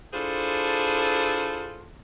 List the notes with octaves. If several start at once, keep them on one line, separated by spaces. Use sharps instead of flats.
D4 E4 F4 G#4 A4 C5